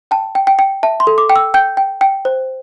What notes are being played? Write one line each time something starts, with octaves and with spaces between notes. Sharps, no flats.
G5 A5
G5
G5
G5
E5 A5
C6
A4
D6
G5
E6
G5 G6
G5
G5
C5